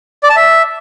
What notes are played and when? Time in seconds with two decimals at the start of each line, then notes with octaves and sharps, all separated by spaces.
0.23 D5
0.30 A5
0.36 E5